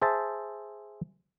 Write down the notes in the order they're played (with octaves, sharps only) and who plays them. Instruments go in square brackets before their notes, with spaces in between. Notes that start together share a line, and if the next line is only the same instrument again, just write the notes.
[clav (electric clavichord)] G#4 C5 E5 A5